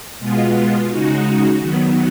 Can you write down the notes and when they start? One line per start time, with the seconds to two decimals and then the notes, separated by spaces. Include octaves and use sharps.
0.19 B2 G#3 B3 F4
0.88 C#3 G#3 D#4 F#4
1.58 D#3 F#3 B3